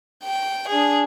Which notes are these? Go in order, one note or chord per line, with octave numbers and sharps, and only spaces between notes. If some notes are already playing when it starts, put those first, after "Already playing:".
G5
D4 G#4